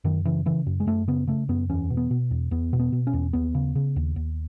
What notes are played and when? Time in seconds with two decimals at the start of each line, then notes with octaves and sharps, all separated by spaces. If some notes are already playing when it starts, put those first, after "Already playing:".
0.04 F#2 D#3
0.25 C#3 E3
0.46 C#3 E3
0.66 F#2
0.80 G#3
0.87 F#2 A3
1.08 C#3 B3
1.27 C#3 A3
1.49 F#2 B3
1.69 E2 C#4
1.90 B2
1.97 B3
2.11 B2
2.31 E2
2.51 E2 B3
2.73 B2
2.79 B3
2.92 B2
3.07 C#4
3.13 E2
3.33 D#2 B3
3.55 C#3
3.76 C#3
3.96 D#2
4.16 D#2